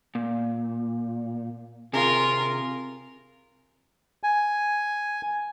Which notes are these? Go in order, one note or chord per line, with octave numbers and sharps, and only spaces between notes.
A#2
C3 F4 G#4 A#4
G#5